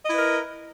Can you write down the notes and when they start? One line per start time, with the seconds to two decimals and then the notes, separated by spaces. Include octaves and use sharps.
0.04 D#5
0.09 E4
0.13 B4
0.17 A#4